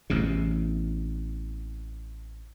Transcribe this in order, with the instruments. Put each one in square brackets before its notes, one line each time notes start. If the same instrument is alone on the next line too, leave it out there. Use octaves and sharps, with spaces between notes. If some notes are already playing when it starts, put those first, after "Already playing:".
[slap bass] A1 E2 C3